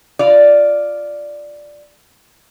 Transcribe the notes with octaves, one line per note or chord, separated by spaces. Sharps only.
F4 D5